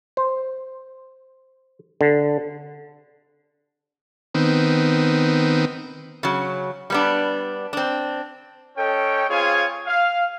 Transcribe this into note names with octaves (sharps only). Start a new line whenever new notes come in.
C5
D3
D#3 B3 C4
C#3 F#3
G3 B3 D4
C4 D4
C#4 A4 C#5 D#5 G5
C4 F4 G#4 C#5 F5 G#5
F5